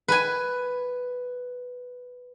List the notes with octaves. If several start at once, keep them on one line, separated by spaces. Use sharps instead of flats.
B4 G#5